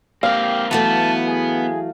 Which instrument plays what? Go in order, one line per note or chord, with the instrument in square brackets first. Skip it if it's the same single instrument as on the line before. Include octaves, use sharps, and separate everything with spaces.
[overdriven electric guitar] A#3 C4 [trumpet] G4 [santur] F5
[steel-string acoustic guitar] E3 F#3 A3 [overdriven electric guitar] B3 [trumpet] A5
[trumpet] G#4